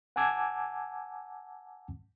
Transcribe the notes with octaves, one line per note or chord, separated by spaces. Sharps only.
F#5 G#5 A5 D6 E6 G#6